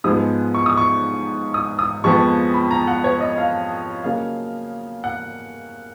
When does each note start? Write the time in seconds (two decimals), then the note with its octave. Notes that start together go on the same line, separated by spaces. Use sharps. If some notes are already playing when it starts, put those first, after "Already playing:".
0.04 G#2 F3 G#3 B3 D#6
0.55 C#6
0.66 D#6
0.77 C#6
1.54 D#6
1.79 D#6
2.04 F2 F3 G#3 B3 C#6
2.54 B5
2.71 A#5
2.87 F#5
3.04 C#5
3.20 D#5
3.38 F5
4.04 C#3 F#3 A#3 F5
5.04 F#5